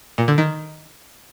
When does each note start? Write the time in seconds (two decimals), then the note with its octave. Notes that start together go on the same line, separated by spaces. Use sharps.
0.18 A#2
0.28 D3
0.38 D#3